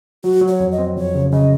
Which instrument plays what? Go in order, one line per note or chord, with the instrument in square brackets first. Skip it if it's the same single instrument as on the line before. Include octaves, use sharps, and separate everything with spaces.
[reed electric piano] F#3 [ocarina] F#4
[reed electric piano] F#3
[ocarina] C#5
[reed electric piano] F2
[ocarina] D#5
[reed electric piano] C4
[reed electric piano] F2 [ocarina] C#5
[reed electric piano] C#3
[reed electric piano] C#3 [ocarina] D#5